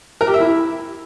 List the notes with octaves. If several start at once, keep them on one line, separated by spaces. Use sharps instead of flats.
A#4
G4
E5
E4